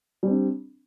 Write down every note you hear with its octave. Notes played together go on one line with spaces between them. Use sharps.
G3 C4 D4